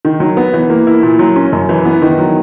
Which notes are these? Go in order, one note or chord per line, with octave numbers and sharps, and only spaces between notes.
D#3
F#3
B3
E3
A#3
E4
A#2
F#3
C#4
F#2
E3
B3
D#3
F#3